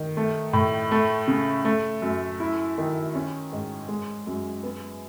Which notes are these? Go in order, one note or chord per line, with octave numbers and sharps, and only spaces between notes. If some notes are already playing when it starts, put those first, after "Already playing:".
Already playing: D#3
A3
A2
A3
C#3
A3
F#2
E4
D#3
C#4
G#2
G#3
F#2
B3